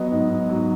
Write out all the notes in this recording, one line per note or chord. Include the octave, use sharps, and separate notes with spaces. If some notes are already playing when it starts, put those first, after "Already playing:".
Already playing: F#3 B3 D#5
G#2
G#2
F#3